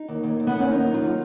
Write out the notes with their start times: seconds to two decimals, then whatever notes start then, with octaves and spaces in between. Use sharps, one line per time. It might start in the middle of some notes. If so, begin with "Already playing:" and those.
Already playing: D#4
0.08 D#2
0.23 D#2
0.40 D#2
0.47 B3
0.55 D#2 C#4
0.71 D#2 D#4
0.86 F#3
0.94 F4
1.02 F#3